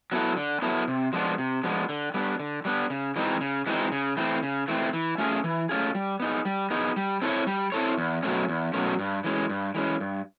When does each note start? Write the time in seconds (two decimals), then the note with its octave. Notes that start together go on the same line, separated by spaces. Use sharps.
0.12 F#3 B3 E4 A4
0.37 D3
0.62 F#3 B3 E4 A4
0.88 C3
1.13 F3 G#3 B3 D4
1.38 C3
1.63 F3 G#3 B3 D4
1.89 D3
2.14 G3 B3 D4
2.40 D3
2.65 G3 B3 D4
2.90 C#3
3.16 E3 G#3 C4 D#4
3.41 C#3
3.67 E3 G#3 C4 D#4
3.92 C#3
4.17 E3 A3 C4
4.43 C#3
4.68 E3 A3 C4
4.93 E3
5.18 A3 C#4 F4 G#4
5.44 E3
5.69 A3 C#4 F4 G#4
5.95 G3
6.20 B3 D#4 G#4
6.45 G3
6.70 B3 D#4 G#4
6.96 G3
7.22 C4 E4 A4 C#5
7.47 G3
7.72 C4 E4 A4 C#5
7.97 E2
8.23 B2 F#3 A3 C#4
8.48 E2
8.74 B2 F#3 A3 C#4
8.99 G2
9.24 E3 G#3 C#4
9.49 G2
9.75 E3 G#3 C#4
10.00 G2